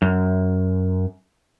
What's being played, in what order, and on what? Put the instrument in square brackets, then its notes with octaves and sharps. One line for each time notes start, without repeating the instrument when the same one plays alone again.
[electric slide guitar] F#2